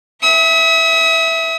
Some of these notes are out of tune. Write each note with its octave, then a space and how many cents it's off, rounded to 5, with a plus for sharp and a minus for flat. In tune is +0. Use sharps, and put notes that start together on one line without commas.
E5 +0 D#6 +45